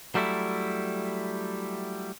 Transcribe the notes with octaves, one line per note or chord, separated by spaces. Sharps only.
F#3 G3 A3 E4